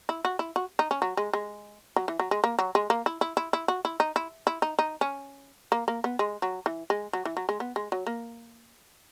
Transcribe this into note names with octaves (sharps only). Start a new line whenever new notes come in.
E4
F#4
E4
F#4
D#4
C#4
F#3
G#3
G#3
F#3
E3
F#3
G#3
A#3
F#3
G#3
A#3
E4
E4
E4
E4
F#4
E4
D#4
E4
E4
D#4
D#4
C#4
A#3
A#3
B3
G#3
F#3
E3
G#3
F#3
E3
F#3
G#3
B3
G#3
F#3
A#3